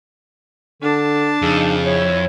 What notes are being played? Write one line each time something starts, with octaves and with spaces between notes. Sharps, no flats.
D3 D4 A5
F2 C#3 D#4
E4 C#5